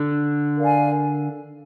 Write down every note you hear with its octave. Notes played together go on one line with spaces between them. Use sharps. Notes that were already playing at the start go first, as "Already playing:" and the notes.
Already playing: D3
A#4 D5 F5 G#5